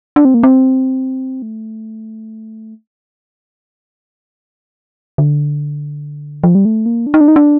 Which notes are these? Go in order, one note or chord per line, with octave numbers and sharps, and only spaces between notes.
D4
C4
A#3
C4
A3
D3
F3
G3
A3
A#3
D4
D#4
D4
D#4
D4